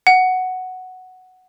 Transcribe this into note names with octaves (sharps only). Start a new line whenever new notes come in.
F#5